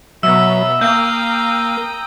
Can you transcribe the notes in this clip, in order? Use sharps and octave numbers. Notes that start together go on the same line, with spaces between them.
B2 F#3 B3 E5 A#5 E6
A#3 F5 G5 A#5 D#6 G6